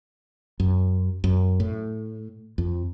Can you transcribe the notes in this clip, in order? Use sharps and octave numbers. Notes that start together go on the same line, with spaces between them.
F#2
F#2
A2
F2